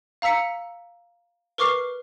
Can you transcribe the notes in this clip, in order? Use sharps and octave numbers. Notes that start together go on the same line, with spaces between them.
F5 A#5 E6 B6 C#7
A#4 B4 C#6 D6 F6 C7